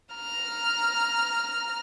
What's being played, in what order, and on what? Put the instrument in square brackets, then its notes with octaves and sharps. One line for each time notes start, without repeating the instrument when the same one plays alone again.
[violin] A#5 F6